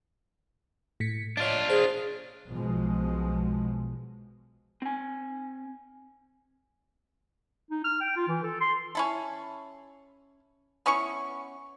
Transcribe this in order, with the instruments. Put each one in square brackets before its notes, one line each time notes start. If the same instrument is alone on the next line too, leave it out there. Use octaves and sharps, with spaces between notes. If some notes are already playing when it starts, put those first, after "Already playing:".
[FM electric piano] A2 B6 C#7
[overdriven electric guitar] D4 F4 [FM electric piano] C#5 D#5
[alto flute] G#4 [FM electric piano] C5
[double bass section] B1 B2 F3 G#3
[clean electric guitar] C4 G#5
[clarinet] D#4
F6
G5
F4
E3
A4
C6
[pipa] C#4 E4 A4
B3 C#4 E4 C#6